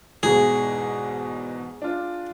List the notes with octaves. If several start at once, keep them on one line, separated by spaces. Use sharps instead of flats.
E2 G#2 B2 G#4
D4 F4